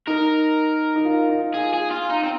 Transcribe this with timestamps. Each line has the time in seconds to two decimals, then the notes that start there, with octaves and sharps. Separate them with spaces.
0.07 D#4 A#4
0.96 D#4
1.05 F4
1.30 D#4
1.55 F4 G#4
1.74 G#4
1.91 F4
2.10 D#4
2.23 C4